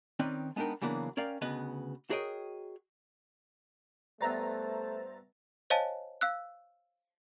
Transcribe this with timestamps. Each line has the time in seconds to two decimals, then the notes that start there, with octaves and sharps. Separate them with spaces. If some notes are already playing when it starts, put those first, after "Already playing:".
0.19 D#3 C4 C#4 D#4 B4 D5
0.56 G#3 B3 D4 D#4 A#4 G5
0.82 C#3 E3 F#3 A#3 B3 D4
1.17 C#4 A#4 D5 F5 G5
1.41 D2 C#3 B3 B4 D#5
2.10 F#4 G#4 A#4 C#5 D#5 G5
4.21 G2 A3 B3 C5 E5 A#5 A6
5.70 C5 C#5 D#5 F5 G#5 A5
6.21 F5 E6 F#6